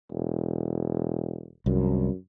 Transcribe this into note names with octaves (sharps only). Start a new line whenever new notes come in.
E1
C2 F#2